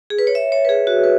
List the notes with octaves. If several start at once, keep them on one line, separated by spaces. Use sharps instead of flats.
G#4
B4
C#5
E5
C#5
B4
G#4
F#4
B4